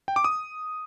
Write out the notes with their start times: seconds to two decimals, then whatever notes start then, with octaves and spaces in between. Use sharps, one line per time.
0.08 G5
0.16 D6
0.24 D#6